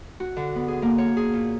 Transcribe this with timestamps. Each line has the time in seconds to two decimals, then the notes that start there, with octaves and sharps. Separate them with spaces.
0.20 F#4
0.36 D3
0.55 B3
0.68 G#4
0.82 A#3
0.98 C#5
1.17 G#4
1.33 A#2